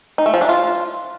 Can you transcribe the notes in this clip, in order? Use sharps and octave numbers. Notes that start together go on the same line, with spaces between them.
D#4
A3
F3
D4
F4